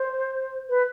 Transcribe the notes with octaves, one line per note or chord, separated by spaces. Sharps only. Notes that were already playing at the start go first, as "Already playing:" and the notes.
Already playing: C5
B4